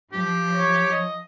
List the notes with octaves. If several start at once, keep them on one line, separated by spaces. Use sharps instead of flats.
F3 G4
C#5
D#5